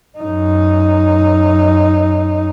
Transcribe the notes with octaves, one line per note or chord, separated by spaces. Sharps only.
F#2 D#4